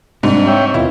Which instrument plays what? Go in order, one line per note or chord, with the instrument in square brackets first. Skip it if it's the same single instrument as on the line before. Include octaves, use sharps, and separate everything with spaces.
[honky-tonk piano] G#2 [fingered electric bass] C3 [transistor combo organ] G3 D4
[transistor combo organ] C#5 E5 G5
[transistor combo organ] D#2 B2 F4 [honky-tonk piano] E4